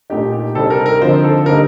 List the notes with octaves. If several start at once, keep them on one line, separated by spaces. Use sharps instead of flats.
A#2 A3 D#4 G4
G4
C3 G3 C4 D#4 A4
A#4
A#4
D3 F3 C4 D#4 C5
A4
D3 G3 A#3 D#4 A#4